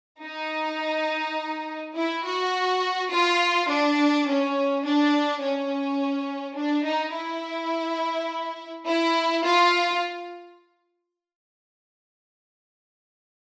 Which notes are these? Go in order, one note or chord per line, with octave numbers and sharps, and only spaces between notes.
D#4
E4
F#4
F4
D4
C#4
D4
C#4
D4
D#4
E4
E4
F4